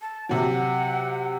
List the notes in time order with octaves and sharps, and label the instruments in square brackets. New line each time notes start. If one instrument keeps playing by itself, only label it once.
[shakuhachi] A5
[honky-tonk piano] C3 F#3 [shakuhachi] F#5